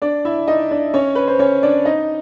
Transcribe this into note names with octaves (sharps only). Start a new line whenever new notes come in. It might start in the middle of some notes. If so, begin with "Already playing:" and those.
D4 D5
E4 E5
D#4 D#5
D4 D5
C#4 C#5
B4
C5
C#4 C#5
D4 D5
D#4 D#5